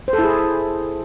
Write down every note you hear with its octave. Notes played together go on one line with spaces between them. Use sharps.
C5
A4
E4
G#4